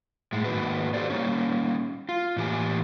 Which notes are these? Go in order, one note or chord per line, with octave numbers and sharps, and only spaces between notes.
A2 G#3
G#2 D#3 A#3 F#4 B4
G4 A4 C5 D5
G3 A#3 C#4
F4
A2 E3 A#3 G4 G#5